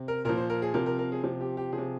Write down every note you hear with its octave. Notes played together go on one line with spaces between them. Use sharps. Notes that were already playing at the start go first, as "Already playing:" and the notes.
Already playing: C3
A#4
A#2 F3 A#4
C5
A#4
G#4
C3 F3 A#4
A#4
A#4
G#4
C3 F3
G4
G4
F3 G#4
C3